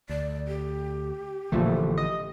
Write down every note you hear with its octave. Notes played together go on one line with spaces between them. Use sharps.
D2 D5
G4
A1 A#2 D3 E3 F3 A3
D#5